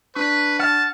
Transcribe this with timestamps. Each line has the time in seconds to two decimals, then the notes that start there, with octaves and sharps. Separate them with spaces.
0.15 D4 B4 C#6
0.59 F#5 A5 F6